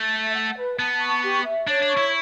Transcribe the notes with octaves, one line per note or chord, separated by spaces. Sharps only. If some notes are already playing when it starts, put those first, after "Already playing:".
Already playing: A3
E5
F#5
B4
B3 A5
C#6
G4
E5
D4 C#5
D4
C#6
E4